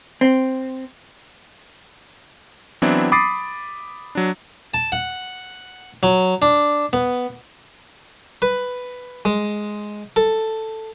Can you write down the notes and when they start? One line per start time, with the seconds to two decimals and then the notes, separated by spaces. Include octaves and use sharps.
0.21 C4
2.82 E3 F#3 B3 C4 D4 E4
3.12 B5 D6 D#6 A6 C7
4.15 F#3 D4
4.74 A5
4.92 F#5
6.03 F#3
6.42 D4
6.93 B3
8.42 B4
9.25 G#3
10.16 A4